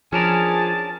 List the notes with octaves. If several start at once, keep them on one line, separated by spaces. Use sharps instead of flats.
F3 C#4 D4 G#4 A#4 A5